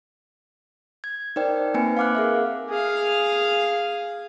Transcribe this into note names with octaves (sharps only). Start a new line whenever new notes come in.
G#6
D#4 A#4 C5 D5 G5
A#3 C4 D#4 B4 G#5 C#7
F5 F#5 D6 F6 F#6
G#4 A#4 E5
G#4 F5